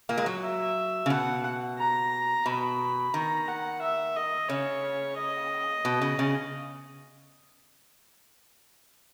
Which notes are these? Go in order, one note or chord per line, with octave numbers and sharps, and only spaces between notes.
A#2 A#3
G#3
F#3
E5
C#3
B2 F#5
A#5
B2 B5
D#3 A#5
F#5
E5
D#5
C#3 C#5
D#5
B2
C#3
C#3